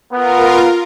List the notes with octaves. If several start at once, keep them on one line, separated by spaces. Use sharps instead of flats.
B3 F4 A#4